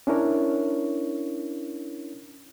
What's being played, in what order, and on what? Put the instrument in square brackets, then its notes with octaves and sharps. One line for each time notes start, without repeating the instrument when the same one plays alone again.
[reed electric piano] C#4 D4 E4 A#4 C#5